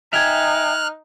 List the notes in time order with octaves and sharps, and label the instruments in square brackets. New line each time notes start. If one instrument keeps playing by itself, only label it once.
[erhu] D#4 [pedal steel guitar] E5 G5 G#5 [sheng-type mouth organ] F6 F#6 [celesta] G#6 F7